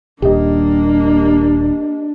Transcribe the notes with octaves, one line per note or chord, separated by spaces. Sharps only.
D#1 A#3 D4 G4 D#5